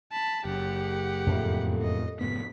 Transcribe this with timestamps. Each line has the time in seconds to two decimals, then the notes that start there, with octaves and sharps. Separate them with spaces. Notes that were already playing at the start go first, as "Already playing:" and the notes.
0.12 A5 B5
0.45 F#1 G4 F#5
1.27 F2 A2
1.82 D#5
2.21 F1 G#2 B3 B6